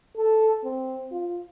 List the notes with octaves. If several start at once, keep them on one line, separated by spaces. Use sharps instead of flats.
A4
C4
F4